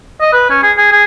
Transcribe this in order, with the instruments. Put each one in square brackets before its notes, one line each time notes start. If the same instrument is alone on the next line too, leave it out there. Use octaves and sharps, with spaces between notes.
[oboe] D#5
B4
C#4
G#4
G#4
G#4